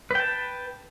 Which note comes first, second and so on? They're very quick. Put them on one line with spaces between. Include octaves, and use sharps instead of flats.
B4 G5 A5